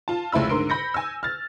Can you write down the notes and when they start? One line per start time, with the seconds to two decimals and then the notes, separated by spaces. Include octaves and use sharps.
0.08 F4 A5
0.32 F1 C#2 E4 B5 E6
0.49 G#2 D3 A#4 C6 D7
0.69 B5 G6 A#6 C#7
0.94 G#5 E6
1.23 F6 A6